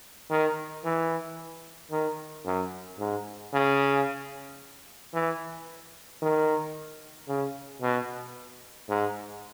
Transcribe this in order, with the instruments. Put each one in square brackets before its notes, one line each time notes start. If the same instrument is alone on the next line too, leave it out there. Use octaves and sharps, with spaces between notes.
[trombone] D#3
E3
D#3
F#2
G#2
C#3
E3
D#3
C#3
B2
G#2